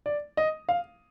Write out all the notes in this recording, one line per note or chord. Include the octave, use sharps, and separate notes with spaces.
D5
D#5
F5